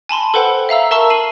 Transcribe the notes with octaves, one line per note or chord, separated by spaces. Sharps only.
G#5 A5 B5 C6
A4 B4 C5 F#5 G5 B5
E5 F5 A#5 E6
A#4 E5 A5 A#5 C#6 E6
C7 D#7 F#7